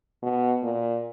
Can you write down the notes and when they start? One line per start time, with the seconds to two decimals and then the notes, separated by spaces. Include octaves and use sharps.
0.23 B2
0.63 A#2